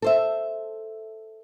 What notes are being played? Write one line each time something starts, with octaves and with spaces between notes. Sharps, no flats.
A4 C5 E5